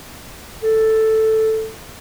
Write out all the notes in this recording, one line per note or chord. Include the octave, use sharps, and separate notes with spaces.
A4